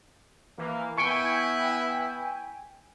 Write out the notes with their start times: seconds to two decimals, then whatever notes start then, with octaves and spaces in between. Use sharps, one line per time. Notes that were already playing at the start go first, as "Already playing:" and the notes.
0.58 E3 A#3
0.98 B3 E4 G5 G#5 C#6 C#7 D7